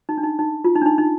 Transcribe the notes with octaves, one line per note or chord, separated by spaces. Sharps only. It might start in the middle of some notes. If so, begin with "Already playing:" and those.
D#4
D4
D#4
D#4
F4
D#4
D4
D#4
D#4